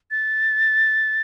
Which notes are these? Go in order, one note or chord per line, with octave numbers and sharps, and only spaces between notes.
A6